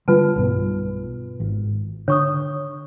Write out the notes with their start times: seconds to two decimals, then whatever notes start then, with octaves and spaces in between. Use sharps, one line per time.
0.08 D3 G3 F4 B4 A5
0.36 B1 G2 B2
1.40 G#1
2.08 D3 C#5 C#6 D#6